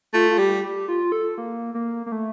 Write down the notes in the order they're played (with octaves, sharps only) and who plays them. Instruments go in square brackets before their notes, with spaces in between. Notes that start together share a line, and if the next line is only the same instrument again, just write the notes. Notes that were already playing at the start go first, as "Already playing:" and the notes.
[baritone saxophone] A3 [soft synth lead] F4
[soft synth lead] F4
[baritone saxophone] G3 [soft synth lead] G4
[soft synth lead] G4
F4
A4
A#3
A#3
A#3
A3